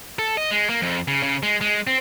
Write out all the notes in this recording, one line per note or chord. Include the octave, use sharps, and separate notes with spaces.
A4
D#5
G#3
A#3
F2
C#3
C#3
G#3
G#3
C4